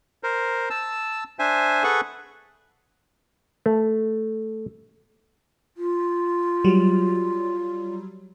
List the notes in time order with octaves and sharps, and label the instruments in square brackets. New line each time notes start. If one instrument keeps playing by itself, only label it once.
[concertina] A#4 C5
A5 E6
D4 C5 E5 G#5
G#4 A4 B4 F#5 C#6
[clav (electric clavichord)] A3
[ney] F4
[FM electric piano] F#3 G3